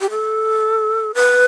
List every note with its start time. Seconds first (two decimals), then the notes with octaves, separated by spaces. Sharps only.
0.01 G4
0.10 A4
1.15 B4